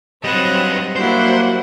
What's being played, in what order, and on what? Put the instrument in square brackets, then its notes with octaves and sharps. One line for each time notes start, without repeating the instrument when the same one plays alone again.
[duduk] F#3 [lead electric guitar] G3 B4 [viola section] C4 [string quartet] D#5 F#5
[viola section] F#3 G3 F#5 [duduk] A#3 [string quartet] D4 E4 [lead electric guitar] C5